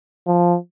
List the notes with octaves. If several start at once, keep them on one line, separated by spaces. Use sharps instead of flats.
F3